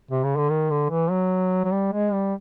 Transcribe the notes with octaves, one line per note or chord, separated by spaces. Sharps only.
C3
C#3
D3
D#3
D3
E3
F#3
F#3
G3
G#3
G3